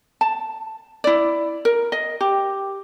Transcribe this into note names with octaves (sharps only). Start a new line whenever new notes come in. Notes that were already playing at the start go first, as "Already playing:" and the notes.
A5
E4 D5
A#4
D#5
G4